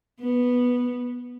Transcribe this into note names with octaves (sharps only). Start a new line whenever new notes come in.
B3